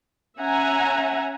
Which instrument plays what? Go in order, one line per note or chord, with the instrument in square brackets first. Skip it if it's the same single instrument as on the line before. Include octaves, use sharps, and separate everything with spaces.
[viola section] C#4 E5 F#5 G#5 A#5